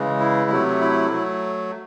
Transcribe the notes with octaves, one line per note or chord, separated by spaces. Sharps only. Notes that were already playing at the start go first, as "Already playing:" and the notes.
Already playing: C#3 E3 G#3
E4
C3 F#3 A3
E4
F#3 A3